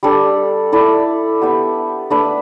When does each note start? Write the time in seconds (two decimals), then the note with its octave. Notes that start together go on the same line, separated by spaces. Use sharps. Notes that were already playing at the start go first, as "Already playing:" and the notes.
0.03 G3 D4 A4
0.72 E4 A4 D5
1.41 B3 G4 B4 E5
2.10 A3 D4 B4 E5